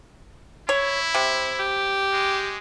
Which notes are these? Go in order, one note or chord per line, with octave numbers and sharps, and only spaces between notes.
E4 C#5
C3
G4
G#3